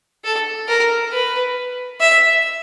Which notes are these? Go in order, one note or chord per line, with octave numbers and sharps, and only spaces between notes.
A4
A#4
B4
E5